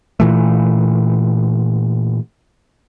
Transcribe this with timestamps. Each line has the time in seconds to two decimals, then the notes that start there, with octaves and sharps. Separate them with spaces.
0.20 A#2 E3 A3